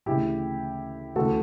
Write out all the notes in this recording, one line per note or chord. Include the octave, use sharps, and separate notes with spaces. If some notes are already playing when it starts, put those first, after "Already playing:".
D2 C#3 E3 E4 G4
D2 C#3 E3 F#4 A4